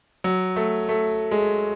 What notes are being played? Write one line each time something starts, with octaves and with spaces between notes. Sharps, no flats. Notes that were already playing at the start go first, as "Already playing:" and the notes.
F#3
A3
A3
G#3